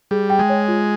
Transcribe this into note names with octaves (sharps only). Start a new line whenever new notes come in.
G3 G#4
G5
G#3
C#5
F4